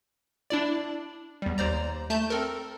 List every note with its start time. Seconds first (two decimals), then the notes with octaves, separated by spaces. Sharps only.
0.50 D4 E4 D5
1.42 E2 G3
1.58 D#2 C5 D5 A#5
2.10 A3 A5 G6
2.30 C4 A4 A#4